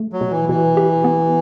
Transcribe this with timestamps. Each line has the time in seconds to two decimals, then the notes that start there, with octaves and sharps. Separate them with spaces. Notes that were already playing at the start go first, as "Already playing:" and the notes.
Already playing: A3
0.13 F#3
0.21 B2
0.31 E3
0.49 B2 E3
0.77 G4
1.04 B3